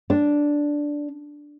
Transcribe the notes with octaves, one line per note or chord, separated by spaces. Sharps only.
D4